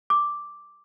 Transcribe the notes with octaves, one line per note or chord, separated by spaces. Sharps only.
D6